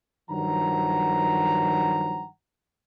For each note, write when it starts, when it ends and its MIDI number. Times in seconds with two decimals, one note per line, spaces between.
0.30 2.27 43
0.30 2.27 51
0.30 2.27 53
0.30 2.27 54
0.30 2.27 78
0.30 2.27 82